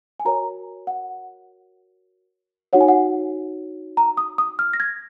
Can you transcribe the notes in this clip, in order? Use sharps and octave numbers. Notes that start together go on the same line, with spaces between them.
G#5
F#4 A#4 C#5 A#5
F#5
D#4 F#4 C#5 F#5
G#5
F#5
A#5
D#6
D#6
F6
A#6
G#6